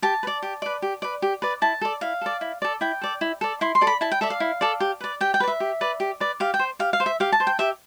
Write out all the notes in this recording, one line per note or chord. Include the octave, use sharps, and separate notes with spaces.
G4 A5
B4
D5
G4
B4 D5
G4
B4 D5
G4
B4 D5
E4 A5
A4 D5
E4 F5
A4 D5
E4
A4 D5
E4 G5
A4 D5
E4
A4 D5
E4 C6
C6
A4 D5
B5
E4 A5
G5
A4 D5 E5
F5
E4
A4 D5
G4
B4 D5
G4 G5
G5
B4 D5
E5
G4
B4 D5
G4
B4 D5
G4 F5
G5
C5
G4 F5
F5
C5
E5
G4 F5
A5
C5
G5
G4 E5